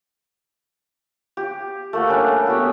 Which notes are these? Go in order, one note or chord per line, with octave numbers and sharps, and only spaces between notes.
G4
A3 A#3 F#4
G3 C#4 D4
B3 F#4 G4 C#5